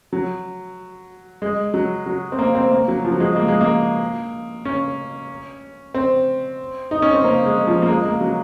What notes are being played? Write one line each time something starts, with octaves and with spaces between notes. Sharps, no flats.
F#3
G#3
F#3
F#3
C4
A#3
C4
A#3
F#3
F3
F#3
G#3
A#3
G#3
A#3
C#4
C4
D#4
C#4
C4
A#3
G#3
F3
A#3
G#3
A#3
F#3